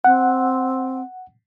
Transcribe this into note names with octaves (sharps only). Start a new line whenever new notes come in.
C4 F#5